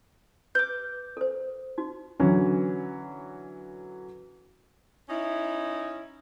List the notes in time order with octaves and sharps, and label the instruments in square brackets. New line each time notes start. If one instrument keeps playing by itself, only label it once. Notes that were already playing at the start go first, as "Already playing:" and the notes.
[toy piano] B4 [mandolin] D6 G6
[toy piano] A4 C5
D#4 F#4
[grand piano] D3 E3 F#3 C#4
[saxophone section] C#4 D#4 E4